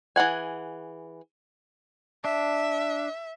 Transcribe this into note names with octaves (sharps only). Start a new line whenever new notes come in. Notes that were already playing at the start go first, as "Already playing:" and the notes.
E3 G#4 F#5 G#5
D4 E5